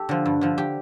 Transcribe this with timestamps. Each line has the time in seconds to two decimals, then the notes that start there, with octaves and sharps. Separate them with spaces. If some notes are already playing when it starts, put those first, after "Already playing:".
Already playing: G4 A4
0.09 D3 F3
0.26 G2
0.41 D3 F3
0.58 G4